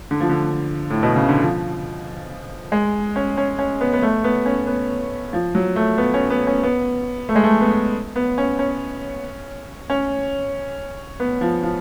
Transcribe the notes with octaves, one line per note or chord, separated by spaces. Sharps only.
D3
F3
D3
A2
B2
C#3
D3
F3
G#3
C#4
C#4
C#4
B3
B3
A3
B3
C#4
B3
F3
F#3
A3
B3
C#4
B3
C#4
B3
A3
G#3
A3
B3
B3
C#4
C#4
C#4
B3
F3
F3